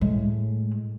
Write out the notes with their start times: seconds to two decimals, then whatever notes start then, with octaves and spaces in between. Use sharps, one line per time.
0.01 A2 G#3